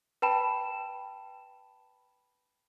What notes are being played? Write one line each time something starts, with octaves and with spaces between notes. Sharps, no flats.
B4 G5 A5 B5 E7